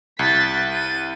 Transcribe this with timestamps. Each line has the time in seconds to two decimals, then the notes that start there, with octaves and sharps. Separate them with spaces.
0.19 C2 A6 B6
0.72 A6 D#7